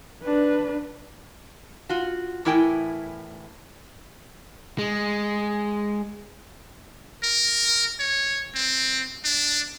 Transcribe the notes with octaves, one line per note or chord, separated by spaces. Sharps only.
D4 B4
F4 F#4
E2 A2 E4 A#4 G5 G#5
G#3
A#4
C#5
C4
D4